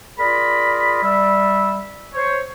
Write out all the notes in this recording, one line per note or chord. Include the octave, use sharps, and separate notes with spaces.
F4 G#4 A#4 D5 B5
G3 D5 E5
C5 C#5